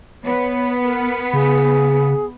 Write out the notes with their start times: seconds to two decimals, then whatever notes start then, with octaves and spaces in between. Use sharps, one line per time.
0.25 B3 C#5
0.84 A#4
1.33 C#3 G#4